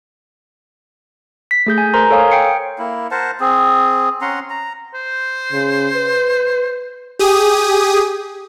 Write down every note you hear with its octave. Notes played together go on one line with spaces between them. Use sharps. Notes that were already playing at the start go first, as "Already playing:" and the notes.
B6
A3 G#4 G6
G#5
A#4 C5 A#5 C6
A4 C#5 F5 G#5 D#6
G5 C7 C#7
A#3 E4
A#4 C5 F#5 A5
C4 G#4
C#4 F#5 A#5 C6
A#5
C5
C#3
B4
G4 G#4 D#6